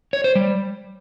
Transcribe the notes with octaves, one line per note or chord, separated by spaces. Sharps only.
C#5
C5
G3